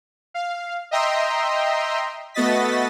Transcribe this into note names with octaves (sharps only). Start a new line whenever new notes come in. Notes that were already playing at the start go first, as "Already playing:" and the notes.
F5
D#5 E5 G5 A#5 C6
A3 B3 F#4 D#5 A6 B6